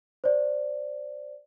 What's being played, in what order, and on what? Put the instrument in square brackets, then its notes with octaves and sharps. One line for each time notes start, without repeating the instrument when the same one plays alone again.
[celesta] C5 D5